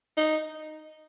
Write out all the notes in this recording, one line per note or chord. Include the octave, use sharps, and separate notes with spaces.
D#4